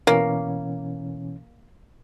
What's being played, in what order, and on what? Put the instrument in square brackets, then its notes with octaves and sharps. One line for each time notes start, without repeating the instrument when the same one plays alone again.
[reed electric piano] B2 E3 C#4 [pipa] A#3